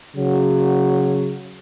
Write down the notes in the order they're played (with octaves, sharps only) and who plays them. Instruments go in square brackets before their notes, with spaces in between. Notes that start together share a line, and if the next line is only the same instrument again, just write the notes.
[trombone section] C#3 F#3